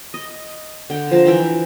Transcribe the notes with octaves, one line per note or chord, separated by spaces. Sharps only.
D#5
D3 G5
F3 A5 A#5
E3 E4 G5 A#5